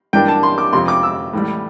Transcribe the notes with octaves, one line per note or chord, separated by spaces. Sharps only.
G2 E3 A#3 D4 G5
A5
C6
D6
F2 C3 F3 C6
D6
E6
A2 E3 G3